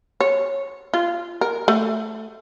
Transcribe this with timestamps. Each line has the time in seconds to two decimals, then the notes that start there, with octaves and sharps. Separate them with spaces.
0.20 C#5
0.94 F4
1.41 A#4
1.68 A3